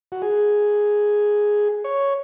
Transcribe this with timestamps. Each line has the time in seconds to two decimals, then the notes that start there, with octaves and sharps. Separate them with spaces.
0.12 F#4
0.22 G#4
1.84 C#5